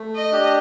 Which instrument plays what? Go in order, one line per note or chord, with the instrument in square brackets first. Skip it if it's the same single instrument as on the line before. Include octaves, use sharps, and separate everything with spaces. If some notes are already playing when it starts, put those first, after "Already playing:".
Already playing: [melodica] A3
[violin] D#5
[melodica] D4 G4